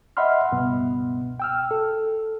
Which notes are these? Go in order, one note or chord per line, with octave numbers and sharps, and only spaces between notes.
D#5 E5 F#5 B5 C6 F6
C#2 G2 B2 B3
G5 E6 F6
A4